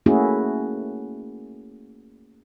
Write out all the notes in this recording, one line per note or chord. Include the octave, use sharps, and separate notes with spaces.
A3 A#3 C#4 E4 F#4 G#4